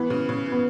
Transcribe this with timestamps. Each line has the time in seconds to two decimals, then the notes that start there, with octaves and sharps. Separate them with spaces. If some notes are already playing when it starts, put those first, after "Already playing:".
Already playing: E3 B3
0.10 C#3
0.29 C#3
0.46 E3
0.52 B3